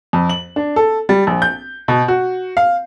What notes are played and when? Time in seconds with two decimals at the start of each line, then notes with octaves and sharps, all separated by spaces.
0.13 F2
0.29 F#7
0.56 D4
0.76 A4
1.09 G3
1.27 A#1
1.42 G6
1.88 B2
2.08 F#4
2.57 F5